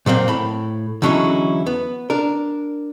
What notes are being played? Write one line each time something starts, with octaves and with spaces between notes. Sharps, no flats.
A#2 F#3 A#3 C4
A2 B5
E2 D3 F#3 C#4 D#4 E4
B3
D4 A#4